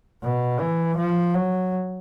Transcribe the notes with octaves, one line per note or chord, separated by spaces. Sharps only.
B2
E3
F3
F#3